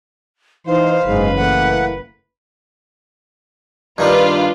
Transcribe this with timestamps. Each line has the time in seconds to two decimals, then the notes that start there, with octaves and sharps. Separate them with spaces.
0.66 E3 D#4 C5 F5
1.06 F#1 G#2 B2 G#3 B4
1.36 E3 A3 A#3 F#5
3.98 G2 D#3 G3 D4 F4 B4